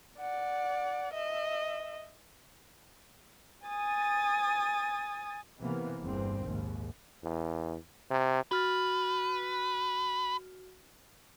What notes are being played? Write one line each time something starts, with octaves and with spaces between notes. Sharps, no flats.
D5 F#5
D#5 E5
G#5 D#6 A6
C3 E3 A#3 B3
G1 E2 G2 A#2 C4
A#1 D#2 G#2
E2
C3
F#4 B4 F6 A6